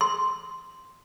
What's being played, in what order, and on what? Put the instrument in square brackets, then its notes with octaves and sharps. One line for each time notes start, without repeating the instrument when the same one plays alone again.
[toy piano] C6